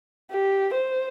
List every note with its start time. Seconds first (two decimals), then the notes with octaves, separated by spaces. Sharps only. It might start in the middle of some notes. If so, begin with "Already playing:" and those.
0.31 G4
0.73 C5